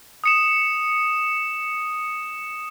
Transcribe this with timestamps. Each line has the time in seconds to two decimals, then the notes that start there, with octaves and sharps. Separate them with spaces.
0.24 D#6 C#7 E7